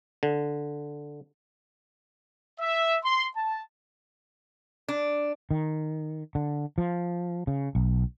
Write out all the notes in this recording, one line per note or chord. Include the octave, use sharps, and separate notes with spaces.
D3
E5
C6
A5
D4
D#3
D3
F3
C#3
B1